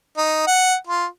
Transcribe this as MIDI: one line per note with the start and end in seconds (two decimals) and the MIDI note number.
0.17 0.43 63
0.47 0.75 78
0.87 1.07 65